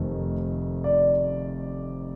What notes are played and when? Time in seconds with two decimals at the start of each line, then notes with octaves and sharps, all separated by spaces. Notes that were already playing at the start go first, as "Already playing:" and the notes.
Already playing: F1 F2 D#3 A3
0.84 D5